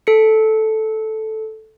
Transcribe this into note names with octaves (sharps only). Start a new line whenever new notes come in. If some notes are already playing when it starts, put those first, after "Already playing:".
A4 C#7